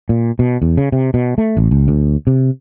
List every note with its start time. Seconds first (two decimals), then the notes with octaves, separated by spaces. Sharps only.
0.09 A#2
0.39 B2
0.62 E2
0.77 C#3
0.92 C3
1.14 B2
1.38 A3
1.57 A1
1.71 C#2
1.88 D2
2.27 C3